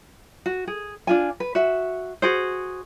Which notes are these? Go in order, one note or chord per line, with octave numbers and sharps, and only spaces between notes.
F#4
G#4
D4 F4 G#5
B4
F#4 E5
F#4 G#4 C5